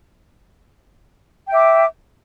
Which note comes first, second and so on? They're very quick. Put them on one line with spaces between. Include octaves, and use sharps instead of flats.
G5 E5 D6